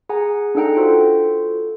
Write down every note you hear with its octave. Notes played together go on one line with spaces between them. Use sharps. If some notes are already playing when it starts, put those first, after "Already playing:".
G#4 F#5 G#5 A#5
D4 D#4 A4 F#5 G5 A#5
F4 F#4 A4 C5